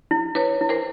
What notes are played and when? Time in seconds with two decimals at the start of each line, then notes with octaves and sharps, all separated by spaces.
0.11 E4
0.35 E4 B4 C#5
0.61 E4
0.69 A#4 C5